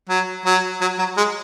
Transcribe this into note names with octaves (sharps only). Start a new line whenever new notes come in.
F#3
F#3
F#3
F#3
G#3